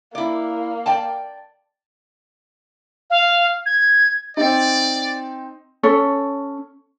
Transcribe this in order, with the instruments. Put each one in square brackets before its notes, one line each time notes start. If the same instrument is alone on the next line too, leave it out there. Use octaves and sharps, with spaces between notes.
[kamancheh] A#3 [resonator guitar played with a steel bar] E4 D5
[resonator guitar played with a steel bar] D5 G5 A5
[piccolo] F5
G#6
[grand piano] C4 D#4 [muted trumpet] D5
[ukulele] C#4 A4 C#5